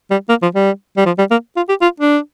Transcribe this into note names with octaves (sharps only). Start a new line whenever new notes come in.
G3
A#3
F3
G3
G3
F3
G3
A#3
F4
G4
F4
D4